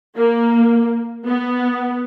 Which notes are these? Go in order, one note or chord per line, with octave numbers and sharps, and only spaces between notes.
A#3
B3